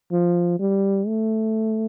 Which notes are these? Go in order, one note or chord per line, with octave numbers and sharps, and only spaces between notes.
F3
G3
A3